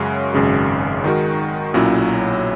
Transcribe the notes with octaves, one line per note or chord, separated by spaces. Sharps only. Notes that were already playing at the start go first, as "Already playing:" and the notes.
Already playing: F#2 C#3 G#3 C#4 F#4
G#1 F#2 C#3 G#3
D#3 G#3 D#4 F#4 A#4
B1 A#2 F#3 C#4 E4